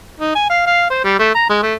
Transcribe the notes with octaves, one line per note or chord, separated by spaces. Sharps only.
D#4
G#5
F5
F5
C5
G3
A3
A#5
G#3
A3